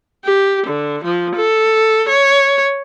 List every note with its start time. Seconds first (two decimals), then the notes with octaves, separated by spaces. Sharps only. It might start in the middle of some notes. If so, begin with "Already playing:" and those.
0.24 G4
0.66 D3
1.04 F3
1.36 A4
2.09 C#5